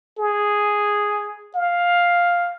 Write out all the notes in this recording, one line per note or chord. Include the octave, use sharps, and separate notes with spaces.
G#4
F5